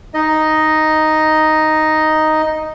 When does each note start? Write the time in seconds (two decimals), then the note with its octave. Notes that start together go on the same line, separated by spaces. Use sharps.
0.14 D#4 D#5